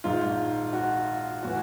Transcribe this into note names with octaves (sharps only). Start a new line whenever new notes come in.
A#1 G#2 D#3 F4
F#4
A2 E3 F#4